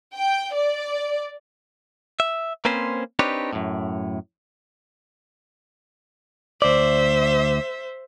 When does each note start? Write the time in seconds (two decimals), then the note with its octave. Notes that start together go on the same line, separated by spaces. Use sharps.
0.14 G5
0.53 D5
2.20 E5
2.65 A#3 C4 C#4 B4 C5
3.19 C4 D4 D#4 G4 B4 C#5
3.53 F#2 A2
6.62 D2 C5 D5 E5